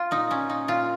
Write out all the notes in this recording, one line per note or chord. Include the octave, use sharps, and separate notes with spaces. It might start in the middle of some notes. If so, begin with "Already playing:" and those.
Already playing: F4
A#2 D#4
A#2 C#4
A#2 D#4
A#2 F4